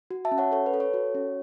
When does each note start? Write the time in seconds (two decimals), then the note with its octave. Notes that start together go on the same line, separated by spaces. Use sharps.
0.11 F#4
0.25 E5 A5
0.32 C#4
0.38 C#5 F#5
0.52 A4 C#5
0.66 B4
0.74 A4
0.80 C#5
0.94 F#4
1.15 C#4